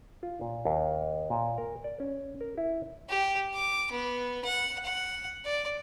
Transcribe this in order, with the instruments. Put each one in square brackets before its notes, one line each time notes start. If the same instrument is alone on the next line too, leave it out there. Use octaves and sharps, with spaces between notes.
[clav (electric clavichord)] F4
A#2
D#2
A#2
A#4
D5
C#4
A#4
E4
[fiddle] G4
D6
B3
F#5
F#5
D5